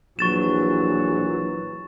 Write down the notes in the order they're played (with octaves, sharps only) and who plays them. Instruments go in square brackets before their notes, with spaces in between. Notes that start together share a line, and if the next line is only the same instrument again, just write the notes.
[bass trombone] A#1 [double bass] E3 F#3 [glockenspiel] C#6 A6 E7